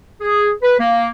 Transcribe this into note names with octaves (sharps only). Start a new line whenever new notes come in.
G#4
B4
A#3